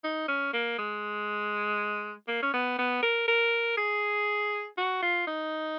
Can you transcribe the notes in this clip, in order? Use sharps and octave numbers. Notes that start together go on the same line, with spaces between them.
D#4
C#4
A#3
G#3
A#3
C#4
B3
B3
A#4
A#4
G#4
F#4
F4
D#4